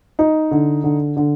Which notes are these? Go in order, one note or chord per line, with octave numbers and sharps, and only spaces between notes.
D#4
D3
D3
D3